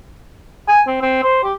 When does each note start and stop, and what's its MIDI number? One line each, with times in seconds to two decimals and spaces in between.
0.68 0.81 80
0.87 1.00 60
1.02 1.23 60
1.24 1.41 72
1.44 1.54 67